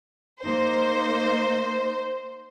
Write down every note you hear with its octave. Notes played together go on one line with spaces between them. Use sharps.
A#3 D#4 C5